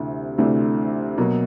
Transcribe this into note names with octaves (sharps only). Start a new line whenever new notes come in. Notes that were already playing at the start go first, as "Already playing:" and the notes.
Already playing: D2 C3 E3 A3 D4
D2 C3 E3 A3 D4
B2 F#3 A#3